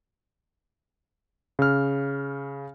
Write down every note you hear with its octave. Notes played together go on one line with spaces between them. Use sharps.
C#3 F6